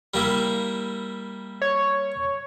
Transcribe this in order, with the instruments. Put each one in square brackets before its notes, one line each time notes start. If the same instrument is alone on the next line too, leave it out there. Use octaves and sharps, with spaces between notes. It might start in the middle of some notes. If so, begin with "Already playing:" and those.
[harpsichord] G3 A#3 E4
[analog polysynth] C#5